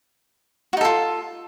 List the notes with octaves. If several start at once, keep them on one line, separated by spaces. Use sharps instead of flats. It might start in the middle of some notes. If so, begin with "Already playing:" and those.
D#4 F4 F#4 A4